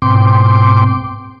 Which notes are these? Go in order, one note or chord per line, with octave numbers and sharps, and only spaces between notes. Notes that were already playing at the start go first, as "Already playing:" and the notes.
G#2 B2 C4 G5 C6 D6